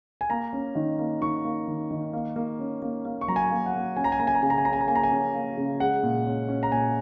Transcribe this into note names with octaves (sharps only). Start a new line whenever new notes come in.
G#5
A#3 A#5
C#4
D#3
A#3
D#3 C#6
A#3
D#3
D#3
A#3
A#3
C#4
A#3
A#3
C#6
F#3 A#5
G#5
A#3
F#5
A#3
C#4 G#5
A#5
G#5
A#3 A#5
G#5
A#5
C#3 G#5
A#5
G#5
C#4 A#5
G#5
A#5
A#3 G#5
A#5
G#5
C#4
A#3
C#3
G#3 F#5
A#2
C#4
C#4
A#5
A#2 G#5